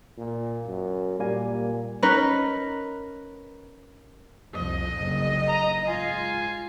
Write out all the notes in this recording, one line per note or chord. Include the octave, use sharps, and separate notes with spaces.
A#2
F#2
A#2 G3 A#3 G#5
C#4 D#4 A#4 B4
C2 F2 F3 D#5
F#1
A#5
G#2 F4 G#5